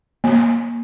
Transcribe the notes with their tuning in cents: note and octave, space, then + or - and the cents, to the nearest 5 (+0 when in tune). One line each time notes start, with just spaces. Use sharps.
A#3 +15